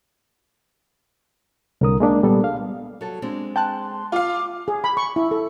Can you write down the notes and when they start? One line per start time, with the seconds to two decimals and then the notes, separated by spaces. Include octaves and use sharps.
1.81 C2 D3 A#4 D#6
2.00 G#3 A#3 D4
2.23 A#2 G3 B3 A4
2.44 F5
3.01 F#3 A4
3.22 G#3 C4 D4
3.56 G5 A5 C6 F#6
4.12 F4 F5 D6
4.68 G#4
4.84 B5
4.97 C#6
5.16 E4
5.31 A4